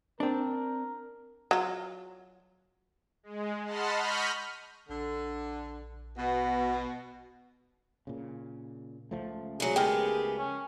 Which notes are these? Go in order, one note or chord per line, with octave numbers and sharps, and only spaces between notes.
C4 D4 A#4
F#3 F4
G#3
D#5 F#5 A5 B5 C6 F6
B5 C#6 D#6 F6 G6 A#6
A#1 D3
B2 F#5
A#2 C#3
C#2 F3 A3
E3 F#3 G#4
G#3 B3 G4 A4 A#4 G5
C#4